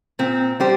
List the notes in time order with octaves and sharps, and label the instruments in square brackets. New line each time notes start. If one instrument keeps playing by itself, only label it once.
[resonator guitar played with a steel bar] A#2 C4
G3 G4 C5